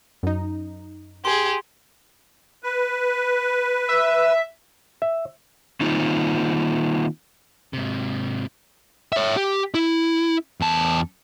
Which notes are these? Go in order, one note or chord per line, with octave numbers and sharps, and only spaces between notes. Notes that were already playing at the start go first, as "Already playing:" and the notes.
F#2 D#4
G4 G#4 C6
B4
E5
E5
D#3 A#3 C4 D#4 F4
G#2 C3
C#5 E5
G4
E4
E2 A5